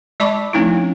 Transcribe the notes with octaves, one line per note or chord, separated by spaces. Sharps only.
G#3 D5 A5 B5 C#6 D6
F3 A3 C4 C#4 D#4 E4